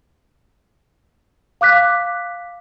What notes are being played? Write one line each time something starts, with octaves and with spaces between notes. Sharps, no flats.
F5 D6 F#6 B6